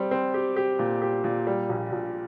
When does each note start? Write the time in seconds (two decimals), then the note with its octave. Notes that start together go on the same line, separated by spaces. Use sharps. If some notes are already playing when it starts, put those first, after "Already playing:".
Already playing: G3 C4
0.11 C4
0.34 G4
0.56 G4
0.79 A#2
1.02 G4
1.24 A#2
1.47 G3
1.69 A#1
1.92 A#1